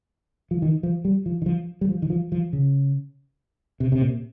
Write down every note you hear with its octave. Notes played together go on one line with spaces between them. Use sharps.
F3
D#3
F3
G3
F3
D#3
F3
G3
F3
D#3
F3
F3
C#3
C3
C3
A#2